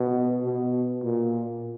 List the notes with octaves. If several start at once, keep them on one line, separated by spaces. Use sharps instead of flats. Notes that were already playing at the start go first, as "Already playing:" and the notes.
Already playing: B2
B2
A#2